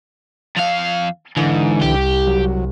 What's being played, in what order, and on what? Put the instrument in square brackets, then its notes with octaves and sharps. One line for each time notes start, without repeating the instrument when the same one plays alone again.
[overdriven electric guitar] F2 F5
[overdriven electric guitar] G#2 [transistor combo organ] D3 E3
[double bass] C2 [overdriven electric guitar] G4
[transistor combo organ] F#3